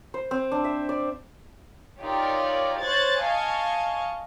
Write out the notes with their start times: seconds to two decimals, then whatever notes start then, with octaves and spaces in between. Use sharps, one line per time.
0.14 C5
0.31 C4
0.52 D4
0.64 E5
0.89 D5
2.01 D#4 F4 G4 A#4 C#5 D5
2.79 C5 C#5 F#6 G#6 A6
3.22 D#5 F5 G#5 A5 C#6